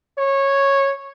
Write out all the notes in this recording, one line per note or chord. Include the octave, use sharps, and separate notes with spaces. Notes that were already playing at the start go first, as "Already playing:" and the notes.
C#5